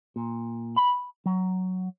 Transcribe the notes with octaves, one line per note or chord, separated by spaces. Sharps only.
A#2
B5
F#3